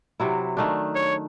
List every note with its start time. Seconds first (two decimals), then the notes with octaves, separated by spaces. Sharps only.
0.20 C3 F#3 E4
0.57 D#3 A3 D4
0.95 C#5